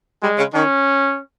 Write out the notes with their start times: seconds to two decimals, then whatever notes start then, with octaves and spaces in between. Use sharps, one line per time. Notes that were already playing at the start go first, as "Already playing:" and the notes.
0.23 G3 G#3
0.39 C#3
0.54 D#3 C#4